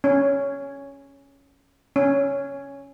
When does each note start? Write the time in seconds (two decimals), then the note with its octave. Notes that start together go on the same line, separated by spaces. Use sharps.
0.04 C#4
1.96 C#4